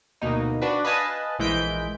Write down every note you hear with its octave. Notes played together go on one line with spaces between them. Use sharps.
D2 B2 A#3 D#4
D4 F#4 B4
B4 D#5 F5 G#5 A5
A#1 E3 G#3 G6 B6 D7